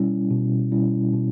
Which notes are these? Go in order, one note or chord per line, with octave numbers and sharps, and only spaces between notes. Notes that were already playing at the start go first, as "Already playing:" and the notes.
Already playing: B2 G3 C#4 E4
B2
G3 C#4 E4
B2